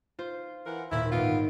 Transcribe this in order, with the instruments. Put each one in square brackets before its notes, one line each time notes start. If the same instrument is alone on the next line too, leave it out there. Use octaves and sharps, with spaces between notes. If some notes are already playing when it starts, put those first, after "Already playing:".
[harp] F4 C5
[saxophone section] E3 A#4 F#5
[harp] D#2 A#2 [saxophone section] E4
[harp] G#1 D7 [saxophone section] B3 F4